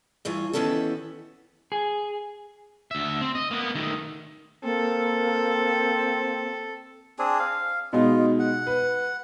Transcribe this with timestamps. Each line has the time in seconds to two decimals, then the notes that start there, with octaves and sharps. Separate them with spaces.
0.25 G2 E3 F4 C#5
0.53 D#3 E3 B3 C#4 G4 A4
1.72 G#4
2.91 D2 E5
3.21 C4
3.35 D#5
3.51 A#3 B3
3.75 D#3 A3
4.64 A#3 C4 A4
7.19 C4 D4 G#4
7.39 F5
7.93 B2 G#3 D#4 F4
8.39 F#5
8.67 B4